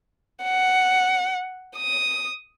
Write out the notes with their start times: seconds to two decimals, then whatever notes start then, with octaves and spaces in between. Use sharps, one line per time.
0.43 F#5
1.77 D#6